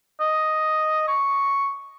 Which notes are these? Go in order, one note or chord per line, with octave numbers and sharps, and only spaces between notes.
D#5
C#6